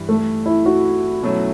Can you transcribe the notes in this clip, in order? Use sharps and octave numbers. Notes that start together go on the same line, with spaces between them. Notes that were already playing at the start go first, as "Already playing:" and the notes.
Already playing: G2 E3 G3
A3
E4
F#4
B2 F#3 A3 C#4